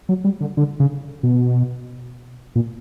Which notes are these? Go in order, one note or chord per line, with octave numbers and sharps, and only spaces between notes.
F#3
G3
D3
D3
C#3
B2
A#2